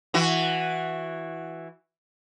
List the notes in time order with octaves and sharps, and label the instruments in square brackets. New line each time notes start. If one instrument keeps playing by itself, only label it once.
[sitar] E3 F#4